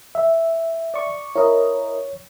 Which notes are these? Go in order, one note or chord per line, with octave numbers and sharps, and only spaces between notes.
E5
D5 C#6
E4 A#4 C#5 D#5